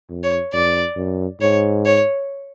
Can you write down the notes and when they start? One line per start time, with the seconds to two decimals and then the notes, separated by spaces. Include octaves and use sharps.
0.09 F2
0.24 C#5
0.53 F2 D5
0.96 F#2
1.41 G#2 C#5
1.85 C#5